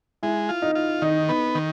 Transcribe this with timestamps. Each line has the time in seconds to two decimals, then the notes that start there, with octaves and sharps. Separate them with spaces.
0.23 G#3 E4
0.49 F4
0.62 D#4
0.75 F4
1.02 D#3 D#4
1.29 B3
1.55 D#3